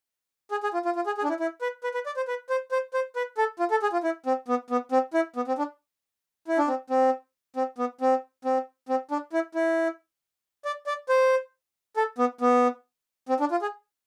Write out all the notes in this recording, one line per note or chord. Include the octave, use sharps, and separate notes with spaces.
G#4
G#4
F4
F4
F4
G#4
G#4
D4
E4
E4
B4
B4
B4
D5
C5
B4
C5
C5
C5
B4
A4
F4
A4
G#4
F4
E4
C4
B3
B3
C4
E4
B3
C4
D4
E4
D4
C4
C4
C4
B3
C4
C4
C4
D4
E4
E4
D5
D5
C5
A4
B3
B3
C4
D4
F4
G#4